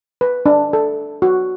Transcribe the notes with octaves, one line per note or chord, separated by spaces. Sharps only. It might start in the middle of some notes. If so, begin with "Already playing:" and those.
B4
D4
A4
F#4